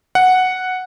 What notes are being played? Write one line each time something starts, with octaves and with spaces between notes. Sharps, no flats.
F#5